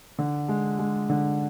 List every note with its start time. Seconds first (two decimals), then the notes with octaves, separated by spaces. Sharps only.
0.19 D3
0.48 G#3
0.79 G#3
1.10 D3